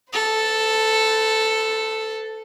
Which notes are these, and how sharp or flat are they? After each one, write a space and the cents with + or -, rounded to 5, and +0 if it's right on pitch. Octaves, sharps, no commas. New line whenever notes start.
A4 +0 C5 -45